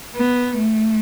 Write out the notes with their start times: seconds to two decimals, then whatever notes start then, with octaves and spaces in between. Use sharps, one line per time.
0.16 B3
0.57 A3